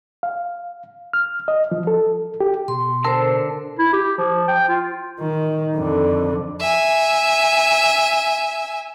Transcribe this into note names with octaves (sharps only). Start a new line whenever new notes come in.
F5
F6
D#5
F3
A4
G4
B2 C6
D3 A#4 C5 A5 E6
E4
G4
F3
G5
F4
D#3
F2 D3
E5 G#5